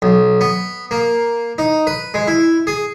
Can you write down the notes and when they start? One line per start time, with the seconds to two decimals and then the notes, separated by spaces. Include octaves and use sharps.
0.02 B1
0.41 B3
0.91 A#3
1.58 D#4
1.87 B4
2.14 G#3
2.27 E4
2.67 G#4